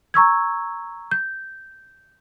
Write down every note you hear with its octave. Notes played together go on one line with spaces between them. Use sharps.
A#5 C#6 E6 G#6
G6